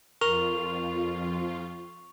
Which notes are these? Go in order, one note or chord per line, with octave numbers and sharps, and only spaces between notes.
F2 F4 A#4 C#6 F7